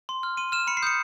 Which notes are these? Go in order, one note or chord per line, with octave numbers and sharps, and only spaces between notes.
C6
F6
C6 D#7
F6 E7
B5 C#7
C7
D#6 G6 C#7